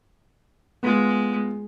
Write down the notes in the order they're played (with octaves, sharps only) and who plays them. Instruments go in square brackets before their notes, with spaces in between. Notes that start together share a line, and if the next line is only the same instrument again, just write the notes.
[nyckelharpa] G#3 [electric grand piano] B3 F4